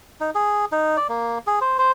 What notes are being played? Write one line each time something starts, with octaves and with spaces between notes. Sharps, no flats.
D#4
G#4
D#4
D5
A#3
G#4
C5
C5